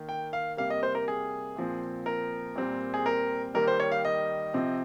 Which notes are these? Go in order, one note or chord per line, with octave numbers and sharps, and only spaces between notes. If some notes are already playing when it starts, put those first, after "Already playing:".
Already playing: D#3 A#3
G5
F5
C3 G3 A#3 F5
D#5
C5
A#4
G#4
A#2 F3 C4
A#4
A#2 G3 C4
G#4
A#4
D#3 G3 A#3 A#4
C5
C#5
F5
D#5
C3 F3 C4